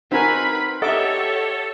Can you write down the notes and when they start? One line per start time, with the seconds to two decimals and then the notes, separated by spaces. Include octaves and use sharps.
0.12 C4 D#4 F#4 A#4 B4 G#5 B5
0.82 G4 A4 C#5 D#5 E5 F#5 D6